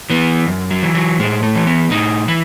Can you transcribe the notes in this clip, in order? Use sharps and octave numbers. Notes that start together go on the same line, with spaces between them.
E3 B3
F#2
F#3
E3
F#3
A2 G#3
A3
E3
B3
A2 D#4
E3 E4